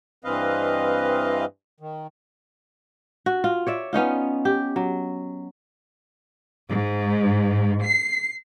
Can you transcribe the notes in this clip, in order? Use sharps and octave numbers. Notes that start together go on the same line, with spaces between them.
G2 E3 C4 B4 D#5 F5
D#3
F#4
F4
C#5 D5 E5
B3 C#4 D#4 F4
G4
F#3
G#2
C7